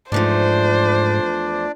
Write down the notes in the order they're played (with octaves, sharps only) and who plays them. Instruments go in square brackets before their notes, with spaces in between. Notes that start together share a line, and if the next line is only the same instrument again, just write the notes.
[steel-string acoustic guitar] E2 F3 A3 [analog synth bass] G#2 [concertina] D4 D5 [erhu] C5